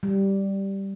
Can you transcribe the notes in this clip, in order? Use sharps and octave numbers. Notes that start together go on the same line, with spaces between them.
G3